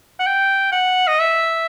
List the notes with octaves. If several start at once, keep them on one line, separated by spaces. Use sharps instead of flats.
F#5
G5
F#5
D#5
E5